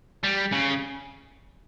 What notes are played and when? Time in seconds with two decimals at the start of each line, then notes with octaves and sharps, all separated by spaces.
0.23 G3
0.52 C#3